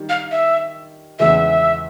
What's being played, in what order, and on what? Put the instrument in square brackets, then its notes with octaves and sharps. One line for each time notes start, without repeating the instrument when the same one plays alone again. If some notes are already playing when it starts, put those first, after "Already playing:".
Already playing: [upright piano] D#3 G3
[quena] F5
E5
[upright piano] E2 C#3 E3 G#3 [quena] E5